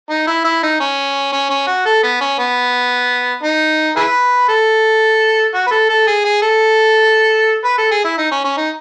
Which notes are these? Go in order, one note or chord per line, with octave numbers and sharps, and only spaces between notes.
D#4
E4
E4
D#4
C#4
C#4
C#4
F#4
A4
B3
C#4
B3
D#4
E4 G#4 B4
A4
F#4
B4
A4
A4
G#4
G#4
A4
B4
A4
G#4
E4
D#4
C#4
C#4
D#4